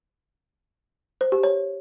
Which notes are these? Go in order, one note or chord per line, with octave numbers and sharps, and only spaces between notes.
C5
G4
C#5